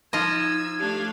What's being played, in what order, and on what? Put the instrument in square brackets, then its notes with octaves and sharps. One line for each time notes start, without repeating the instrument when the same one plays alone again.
[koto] F3 F4 D#5 [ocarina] D#4 [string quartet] E6 [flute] G#6
[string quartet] A3 D4 F5 [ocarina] G4